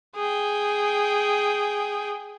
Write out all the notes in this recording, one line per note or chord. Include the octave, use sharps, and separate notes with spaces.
G#4 G5